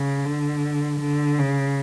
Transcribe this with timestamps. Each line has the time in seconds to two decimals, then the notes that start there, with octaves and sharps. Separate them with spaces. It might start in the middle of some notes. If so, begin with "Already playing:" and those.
Already playing: C#3
0.25 D3
1.00 D3
1.39 C#3